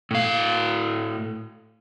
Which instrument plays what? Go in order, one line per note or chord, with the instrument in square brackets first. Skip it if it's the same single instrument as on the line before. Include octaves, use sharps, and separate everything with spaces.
[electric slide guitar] A2 F5